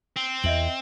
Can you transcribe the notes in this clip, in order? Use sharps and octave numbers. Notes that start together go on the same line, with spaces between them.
C4
E2 D#5 E5 F#7